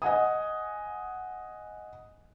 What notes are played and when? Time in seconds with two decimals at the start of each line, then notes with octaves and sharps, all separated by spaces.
0.02 D#5 F#5 G#5 D#6